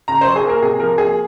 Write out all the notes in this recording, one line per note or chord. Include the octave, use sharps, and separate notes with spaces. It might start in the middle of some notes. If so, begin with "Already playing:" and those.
C#3 A#5
F#3 C5
G#4
A#3
A#4
C3 G#4
F3 A#4
A#3 G#4